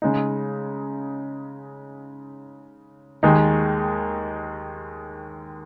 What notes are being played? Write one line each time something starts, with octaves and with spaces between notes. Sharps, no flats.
C#3 G#3 D#4
D#2 D#3 G#3 D#4